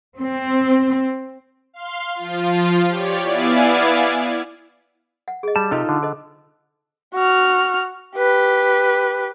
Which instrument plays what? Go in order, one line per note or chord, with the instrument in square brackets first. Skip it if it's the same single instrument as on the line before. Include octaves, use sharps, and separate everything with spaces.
[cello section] C4
[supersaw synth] F5 C6
F3 F4
G4 C#5 D5
B3 E4 D5 F5 G#5
[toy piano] F#5
G#4 D#5
[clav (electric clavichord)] G3 [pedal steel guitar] A5
[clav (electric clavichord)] C3 G4 [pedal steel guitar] D#4 F4 A4 [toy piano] C5 D#5
[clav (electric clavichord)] D3
[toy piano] A4 C5 D#5
[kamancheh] F#4 F6
G4 B4